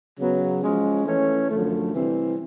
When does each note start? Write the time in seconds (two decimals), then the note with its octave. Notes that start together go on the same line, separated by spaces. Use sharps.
0.18 C#3 F#3 B3
0.62 F3 G#3 C#4
1.06 E3 A3 C#4
1.49 F#2 D3 F3 A3
1.93 C3 E3 G3 C4